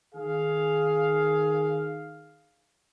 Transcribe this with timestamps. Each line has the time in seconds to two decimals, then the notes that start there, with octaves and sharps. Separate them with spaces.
0.15 D#3 G#4 F5